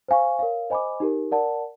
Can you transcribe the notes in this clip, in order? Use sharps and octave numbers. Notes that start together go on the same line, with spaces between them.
C5 F5 G#5 C#6
A#4 C#5 F5
C5 D#5 G#5 B5 D6
D#4 G4 A#4
A#4 D5 F#5 A5